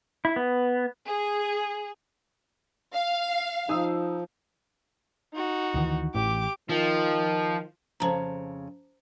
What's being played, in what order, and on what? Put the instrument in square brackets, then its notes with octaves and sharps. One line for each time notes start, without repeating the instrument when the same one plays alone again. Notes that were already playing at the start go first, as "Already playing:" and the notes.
[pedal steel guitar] E4
B3
[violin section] G#4
F5
[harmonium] F3 [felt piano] D#4 D#6 E6
[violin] D#4 F#4
[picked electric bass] D2 D#3 E3
[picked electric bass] A1 E3 [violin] G4 D6
[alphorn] D#3 [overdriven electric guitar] F3
[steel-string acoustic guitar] F2 C#3 [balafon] C5 A5 A#5